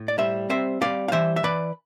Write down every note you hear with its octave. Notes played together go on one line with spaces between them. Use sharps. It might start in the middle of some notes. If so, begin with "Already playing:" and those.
Already playing: A2
D5
G3 C5 E5
C4 C5 E5
G3 D5 F5
F5
E3 C5 E5
E5
E3 B4 D5